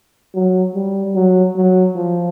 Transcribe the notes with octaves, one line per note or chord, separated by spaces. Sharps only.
F#3
G3
F#3
F#3
F3